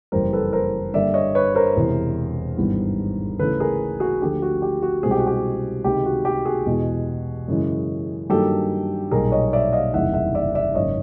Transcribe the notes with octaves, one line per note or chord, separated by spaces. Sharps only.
F#1 F2 C#3 E3 G3 A#4 C5
A4 B4
A#4 C5
G2 D3 G3 A#3 D5 E5
C#5 D#5
B4 C#5
A#4 C5
E1 E2 C3
G#1 G2 E3 G3 B3
D2 C#3 E3 A4 B4
G#4 A#4
F#4 G#4
D2 D3 F3 A3 G4
F#4
G4
F#4
C2 B2 G#3 C4 G#4
G4
F#4
G4
C#2 C3 D#3 G4
F#4
G4
F#4 G#4
E2 B2 G#3 B3
F#2 C#3 E3 G#3
G2 D#3 F#3 A#3 G4 A4
B1 A#2 G3 G#4 A#4
C#5 D#5
D5 E5
D#5 F5
F#1 E2 C3 D#3 G3 E5 F#5
E5 F#5
D5 E5
D5 E5
G#1 F#2 C#3 C#5 D#5